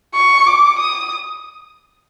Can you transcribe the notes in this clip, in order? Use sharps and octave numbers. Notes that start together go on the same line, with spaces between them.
C#6
D6
D#6